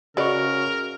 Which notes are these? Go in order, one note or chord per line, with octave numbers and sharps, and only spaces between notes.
C#3 G#3 F#4 A#4 B4 D5 C#6